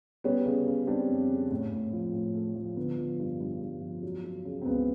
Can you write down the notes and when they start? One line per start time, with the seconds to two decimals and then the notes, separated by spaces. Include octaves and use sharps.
0.24 G3 B3 C#4
0.46 C#3
0.67 C#3
0.87 G3 C4 D4
1.09 F2
1.29 C#3
1.51 A2
1.72 A2
1.93 F3
2.13 A2
2.35 A3
2.55 F3
2.77 D3 B3
2.98 F3
3.19 G2
3.40 G2
3.61 G2
3.81 F3
4.03 F#3
4.24 F#3
4.45 C#3
4.62 C4
4.65 C#2 B3